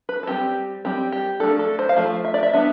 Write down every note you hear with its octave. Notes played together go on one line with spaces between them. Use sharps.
B4
A4
G3 C4 G4
G3 C4 G4
G4
F3 A3 D4 A4
A4
C5
F5
F3 A3
E5
D5
E5
G3 B3 D4 E5